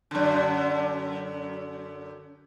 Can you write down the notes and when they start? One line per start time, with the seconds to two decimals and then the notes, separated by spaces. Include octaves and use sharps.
0.11 F#2 D3